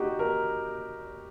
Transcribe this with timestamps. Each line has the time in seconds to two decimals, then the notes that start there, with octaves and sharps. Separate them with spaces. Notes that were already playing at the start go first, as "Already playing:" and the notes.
Already playing: D#4 F#4 G4
0.19 A#4